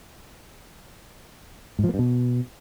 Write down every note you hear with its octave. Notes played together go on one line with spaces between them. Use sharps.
G#2
F3
A#3
G2
B2